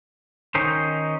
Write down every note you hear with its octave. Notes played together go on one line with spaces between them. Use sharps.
D#3 C#4 D#4 C5